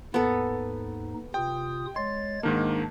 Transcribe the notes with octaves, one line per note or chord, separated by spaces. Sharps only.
D#2 G#2 B3 D#4 A4
C3 F4 G5 D#6
G#3 C#5 C6 A6
G#2 D#3 A#3 D4